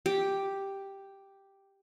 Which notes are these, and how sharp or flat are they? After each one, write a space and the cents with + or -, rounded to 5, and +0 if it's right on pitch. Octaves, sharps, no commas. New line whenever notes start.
G4 +0